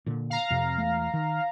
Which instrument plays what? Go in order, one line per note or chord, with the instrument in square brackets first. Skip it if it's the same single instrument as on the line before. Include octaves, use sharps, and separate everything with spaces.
[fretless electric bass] A#2 D3
[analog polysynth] F5 A#5
[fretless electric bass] F2 C3
E1 E2 A3
D#3